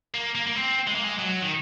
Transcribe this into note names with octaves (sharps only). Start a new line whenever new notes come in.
A#3
A#3
A#3
C4
G#3
A#3
G#3
F#3
D#3